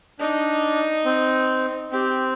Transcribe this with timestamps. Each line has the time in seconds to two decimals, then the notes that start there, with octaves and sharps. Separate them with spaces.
0.20 D4 D#4
1.05 C4
1.92 C4 G4